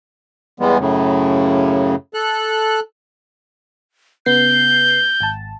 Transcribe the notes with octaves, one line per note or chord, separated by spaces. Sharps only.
E2 E3 G3 G#3 B3
F#2 A2 C#3
A4 F#6
C#3 B3 G6 C7
G#1 A5